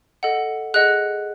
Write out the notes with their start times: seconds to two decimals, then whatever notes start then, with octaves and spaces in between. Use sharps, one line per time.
0.23 A4 D#5 F#5
0.74 G#4 D#5 F#5 F#6